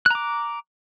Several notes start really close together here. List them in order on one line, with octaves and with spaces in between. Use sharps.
F#6 A#5 D6